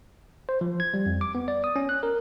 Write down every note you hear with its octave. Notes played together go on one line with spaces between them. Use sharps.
C5
F3
G#6
G3
F2
D6
B3
D5
D#6
C#4
F#6
A#4